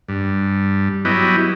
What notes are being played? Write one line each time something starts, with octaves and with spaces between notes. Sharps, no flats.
G2
F#3 B3 E4 G4 D#5